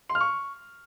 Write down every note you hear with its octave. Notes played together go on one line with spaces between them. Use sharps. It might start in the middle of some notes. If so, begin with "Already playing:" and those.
C6
F6
C#6